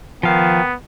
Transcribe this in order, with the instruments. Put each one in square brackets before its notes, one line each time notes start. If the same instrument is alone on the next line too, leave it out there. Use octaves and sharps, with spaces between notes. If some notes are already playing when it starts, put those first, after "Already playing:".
[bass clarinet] D#3 [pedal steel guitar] F3 F5 [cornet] B3